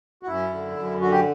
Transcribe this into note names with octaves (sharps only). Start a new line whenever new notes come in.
F#4
F#2 E4
D3
F#2
D3 F#4
G4